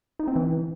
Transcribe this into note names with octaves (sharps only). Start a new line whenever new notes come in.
D#4
C4
E3